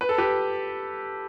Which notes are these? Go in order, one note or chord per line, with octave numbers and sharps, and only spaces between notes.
B4
A4
G4 B4